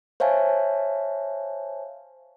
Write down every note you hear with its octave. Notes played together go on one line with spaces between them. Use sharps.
C5 C#5 E5 F5 G#5 A5